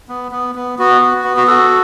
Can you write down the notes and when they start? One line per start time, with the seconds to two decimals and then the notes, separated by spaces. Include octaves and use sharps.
0.09 B3
0.32 B3
0.55 B3
0.79 B3 F#4
1.01 F#4
1.24 B3
1.37 F#4
1.47 F#4 A4